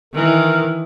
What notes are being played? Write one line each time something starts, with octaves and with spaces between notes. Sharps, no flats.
D#3 E3 A#4